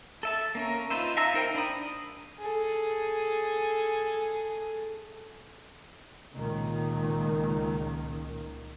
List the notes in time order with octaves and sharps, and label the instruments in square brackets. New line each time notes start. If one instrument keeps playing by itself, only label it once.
[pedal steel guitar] A4 E5 A5
A#3 C#4 A#4
D#4 F4 B4 C5 E5
E5 F5 A5 A#5 E6
D#4 A#4 C5 G5
D4 A#5 B5 D#6
[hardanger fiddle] G#4 A4
[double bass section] C#2 A#2 D#3